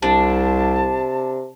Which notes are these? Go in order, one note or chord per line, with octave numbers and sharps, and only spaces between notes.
C2 C3 D4 A5